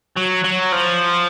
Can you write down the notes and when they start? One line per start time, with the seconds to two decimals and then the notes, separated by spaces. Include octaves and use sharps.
0.16 F#3
0.44 F#3
0.72 F3